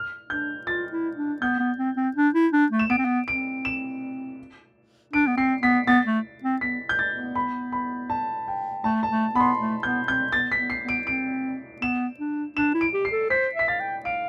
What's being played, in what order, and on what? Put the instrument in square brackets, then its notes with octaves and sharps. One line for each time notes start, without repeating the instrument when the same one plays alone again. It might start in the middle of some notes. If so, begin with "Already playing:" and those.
Already playing: [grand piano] F6
[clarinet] D4 [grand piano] G6
[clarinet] F4 [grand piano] A6
[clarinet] E4
D4
[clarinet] B3 [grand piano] G6
[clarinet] B3
C4
C4
D4
E4
D4
A3
[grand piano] E7
[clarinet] B3 [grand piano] D7
[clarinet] C4
B3
[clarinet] C4 [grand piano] D7
[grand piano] E7
[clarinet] D4 [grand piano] D7
[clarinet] B3
[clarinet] C4 [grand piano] C7
[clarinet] B3 [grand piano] B6
[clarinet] B3 [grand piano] A6
[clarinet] A3
C4
[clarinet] B3 [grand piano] B6
[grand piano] G6
A6
[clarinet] B3
[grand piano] B5
B5
A5
G5
[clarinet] A3 [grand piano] A5
[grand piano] A5
[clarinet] A3
[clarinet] B3 [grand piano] B5
[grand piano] C6
[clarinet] A3
[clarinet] B3 [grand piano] G6
[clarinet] C4 [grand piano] G6
[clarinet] B3 [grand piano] A6
[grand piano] B6
[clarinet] B3
[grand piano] C7
[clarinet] B3
[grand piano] D7
[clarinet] C4 [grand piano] D7
[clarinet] B3 [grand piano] E7
[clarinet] D4
[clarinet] D4 [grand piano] E7
[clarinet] E4
[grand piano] D7
[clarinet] G4
[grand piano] C7
[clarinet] A4
[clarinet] C5 [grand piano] B6
[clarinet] E5 [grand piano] B6
[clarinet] F5 [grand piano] A6
[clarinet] G5
[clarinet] F5 [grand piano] D7